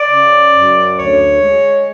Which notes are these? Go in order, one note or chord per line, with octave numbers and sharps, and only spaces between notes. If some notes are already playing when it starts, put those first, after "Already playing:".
Already playing: D5
C#3
F#2
D2 C#5
G#3